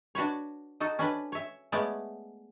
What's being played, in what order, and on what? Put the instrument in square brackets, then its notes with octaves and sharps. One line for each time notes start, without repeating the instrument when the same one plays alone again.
[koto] D4 F#4 B4 C#5
D#4 F#4 A4
C#4 D4 B4
C#5 E5
G#3 A3 B3 C#4 D5